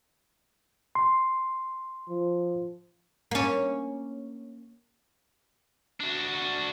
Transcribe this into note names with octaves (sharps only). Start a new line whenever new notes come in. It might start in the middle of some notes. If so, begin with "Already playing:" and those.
C6
F3
A#3 C#4
D4 F#4